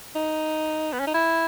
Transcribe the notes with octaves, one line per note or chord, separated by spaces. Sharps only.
D#4
B3
C#4
D#4
E4